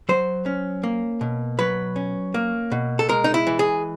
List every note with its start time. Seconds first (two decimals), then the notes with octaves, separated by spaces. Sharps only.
0.09 F#3 C5
0.46 C#4
0.83 A#3
1.21 B2
1.59 F#3 B4
1.96 C#4
2.34 A#3
2.72 B2
2.99 A4
3.09 G#3 A#4
3.24 D#4
3.34 E4
3.47 E3
3.59 G#4